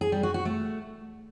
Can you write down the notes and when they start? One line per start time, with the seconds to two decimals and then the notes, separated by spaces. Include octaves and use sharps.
0.01 G#4
0.12 G3
0.23 F#4
0.34 F#4
0.45 A3